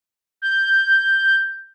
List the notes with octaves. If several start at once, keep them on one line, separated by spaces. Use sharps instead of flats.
G6